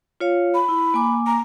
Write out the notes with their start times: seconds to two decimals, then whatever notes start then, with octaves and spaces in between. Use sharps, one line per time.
0.20 F4 C#5 F5
0.54 B5
0.69 E4
0.94 A#3 G#5 D6
1.26 A#5